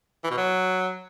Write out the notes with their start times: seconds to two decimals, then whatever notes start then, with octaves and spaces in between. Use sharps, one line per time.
0.24 E3
0.30 B2
0.37 F#3